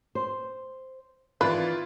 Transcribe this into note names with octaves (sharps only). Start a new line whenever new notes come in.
C5
D#3 E3 C4 E4 F4 B4 D5